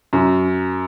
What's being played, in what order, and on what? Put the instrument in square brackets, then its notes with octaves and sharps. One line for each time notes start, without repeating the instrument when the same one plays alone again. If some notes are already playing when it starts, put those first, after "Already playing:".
[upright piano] F#2